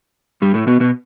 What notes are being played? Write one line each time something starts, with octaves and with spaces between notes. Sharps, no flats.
G2 G3
A2 A3
B2 B3
B2 B3